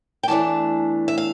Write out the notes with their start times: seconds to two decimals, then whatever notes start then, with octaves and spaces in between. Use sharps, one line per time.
0.23 G5
0.28 E2 E3 A3 D4 A5
1.08 E5
1.18 F5